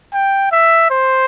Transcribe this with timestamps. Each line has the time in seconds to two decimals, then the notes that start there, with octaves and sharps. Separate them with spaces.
0.14 G5
0.52 E5
0.91 C5